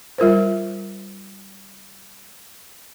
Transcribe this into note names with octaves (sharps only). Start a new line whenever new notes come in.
G3 F4 A#4 C5